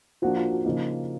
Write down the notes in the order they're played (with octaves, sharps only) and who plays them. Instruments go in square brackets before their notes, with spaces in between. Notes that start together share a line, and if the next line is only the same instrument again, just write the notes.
[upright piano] F3 A#3 D4 F#4
F4
F#4
C#3 F3 A#3 D#4